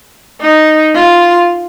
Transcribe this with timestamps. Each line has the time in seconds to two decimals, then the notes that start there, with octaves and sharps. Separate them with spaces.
0.40 D#4
0.95 F4